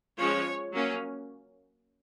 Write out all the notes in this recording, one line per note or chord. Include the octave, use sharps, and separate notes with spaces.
F3 G#3 C#4 C#5
F#3 A#3 C#4